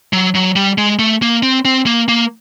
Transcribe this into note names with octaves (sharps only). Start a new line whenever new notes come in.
F#3
F#3
G3
G#3
A3
A#3
C4
C4
A#3
A#3